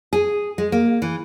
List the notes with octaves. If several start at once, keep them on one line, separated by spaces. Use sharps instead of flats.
G#4
G#3
A#3
E3